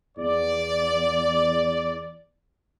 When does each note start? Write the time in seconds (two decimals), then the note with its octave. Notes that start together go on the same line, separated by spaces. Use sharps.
0.18 E2 D5